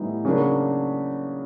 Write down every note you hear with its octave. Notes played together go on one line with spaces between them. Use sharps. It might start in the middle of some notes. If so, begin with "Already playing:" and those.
Already playing: A2 E3 G3 B3 D#4
C#3 F#3 A#3 D4